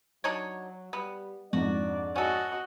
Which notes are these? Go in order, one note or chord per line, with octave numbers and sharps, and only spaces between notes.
F#3 D4 D#4 C#5
G3 B3
F2 G#2 D4 F#4 D5
C#4 F#4 A4 D#5